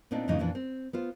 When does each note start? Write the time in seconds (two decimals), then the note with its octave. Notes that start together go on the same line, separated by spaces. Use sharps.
0.11 A#2 B3 C4 D4 D#4
0.28 F2 A2 C#3 E3 D#4
0.39 F2 A#2 E3 D4
0.55 C4
0.93 B3 F4 C5